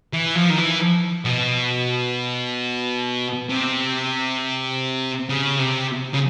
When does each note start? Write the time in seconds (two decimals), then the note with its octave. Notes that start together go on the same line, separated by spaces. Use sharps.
0.13 E3
0.36 F3
0.50 D#3
0.58 E3
1.25 B2
3.50 C3
5.29 C#3
5.59 C3
6.14 C#3